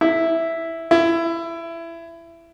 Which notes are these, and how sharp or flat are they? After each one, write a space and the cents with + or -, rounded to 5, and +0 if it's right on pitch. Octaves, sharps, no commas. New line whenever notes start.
E4 +0
E4 +20